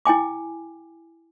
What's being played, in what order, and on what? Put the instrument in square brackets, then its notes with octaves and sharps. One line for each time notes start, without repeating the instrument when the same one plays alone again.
[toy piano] E4 G5 G#5 D6